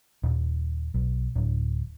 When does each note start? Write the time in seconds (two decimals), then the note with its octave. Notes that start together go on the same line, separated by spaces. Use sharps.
0.23 D#1
0.94 B1
1.36 D1